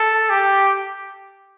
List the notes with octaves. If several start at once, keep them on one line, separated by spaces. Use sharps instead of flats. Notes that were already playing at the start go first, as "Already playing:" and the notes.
Already playing: A4
G4